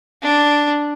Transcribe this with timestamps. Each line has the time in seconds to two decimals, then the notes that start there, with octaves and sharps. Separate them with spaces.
0.23 D4